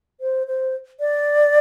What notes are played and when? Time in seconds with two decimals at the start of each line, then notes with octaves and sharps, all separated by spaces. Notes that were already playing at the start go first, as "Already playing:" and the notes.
0.21 C5
0.47 C5
1.00 D5